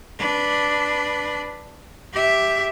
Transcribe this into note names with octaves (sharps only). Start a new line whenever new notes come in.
D4 B4
G4 E5